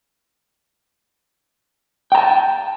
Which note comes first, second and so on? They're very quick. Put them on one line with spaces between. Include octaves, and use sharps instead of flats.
G5 A#5 A5